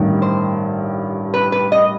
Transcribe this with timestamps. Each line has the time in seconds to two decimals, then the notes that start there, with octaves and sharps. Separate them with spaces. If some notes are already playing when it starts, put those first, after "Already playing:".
Already playing: A1 G2 D#3
0.22 C5
1.34 B4
1.52 B4
1.72 D#5